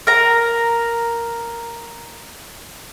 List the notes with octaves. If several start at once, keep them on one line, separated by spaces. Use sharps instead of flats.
A#4 A#5